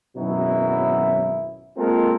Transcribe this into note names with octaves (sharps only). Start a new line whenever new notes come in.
G#1 F#2 B2 F#3 E4
G#3 A#3 C4 F4 A4 A#4